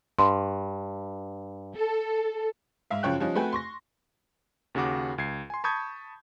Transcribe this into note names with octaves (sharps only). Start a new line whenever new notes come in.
G2 C6
A4
G#2 E5 F5
F#2 C#3 F3 C#5 G5 F#6
F3 G3 C#4 D#4
A3 C4 F#4 B4 G5 G#5
C6 C#6 A#6
D#2 C#3 F#4 F#5 D6
C#2 G#6 C7
G#5 C6
A5 B5 C#6 D#6 G6 G#6